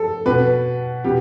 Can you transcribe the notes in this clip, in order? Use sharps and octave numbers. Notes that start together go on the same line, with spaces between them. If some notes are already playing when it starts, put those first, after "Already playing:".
Already playing: A4
B2 B4
B2 G4